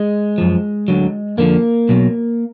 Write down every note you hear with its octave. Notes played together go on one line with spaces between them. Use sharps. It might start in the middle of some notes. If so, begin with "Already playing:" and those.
Already playing: G#3
F#2 F3
D2 D3 F#3
F2 D3 F3 A#3
B1 B2 F#3